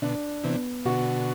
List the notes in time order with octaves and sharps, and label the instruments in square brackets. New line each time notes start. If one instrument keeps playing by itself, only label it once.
[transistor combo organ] B2 D3 [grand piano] D4
[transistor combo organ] C3 E3 [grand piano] B3
[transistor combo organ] B2 D3 [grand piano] F#4